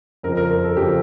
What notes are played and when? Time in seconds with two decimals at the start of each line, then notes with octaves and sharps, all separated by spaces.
0.23 F2 C#3 F3 A#4
0.37 A#4
0.50 A#4
0.64 A4
0.77 F2 C#3 F3 G4